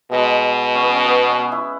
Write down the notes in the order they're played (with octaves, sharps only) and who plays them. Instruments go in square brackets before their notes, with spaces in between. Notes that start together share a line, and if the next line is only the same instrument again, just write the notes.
[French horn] B2 [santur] G#3
[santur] C#4
B3
C#4
B3
C#4
E4